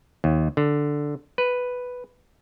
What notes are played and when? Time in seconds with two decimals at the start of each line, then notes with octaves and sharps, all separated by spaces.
0.24 D#2
0.57 D3
1.38 B4